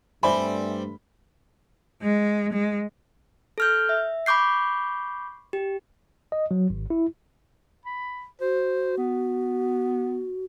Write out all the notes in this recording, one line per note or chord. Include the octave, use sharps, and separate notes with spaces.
G2 G3 A3 C4 D5 E5 G#5 B5
G#3
G#3
A4 F6 G6
E5
B5 C#6 D6 G6 C7
G4
D#5
F#3
G#1
E4
B5
F#4 C5
B3